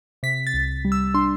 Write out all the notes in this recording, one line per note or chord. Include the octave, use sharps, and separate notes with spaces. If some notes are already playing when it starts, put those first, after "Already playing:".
C3 B6
A6
C2
G3
E6
D4 C6